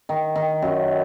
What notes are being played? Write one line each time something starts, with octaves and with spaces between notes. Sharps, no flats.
D#3
D#3
F#2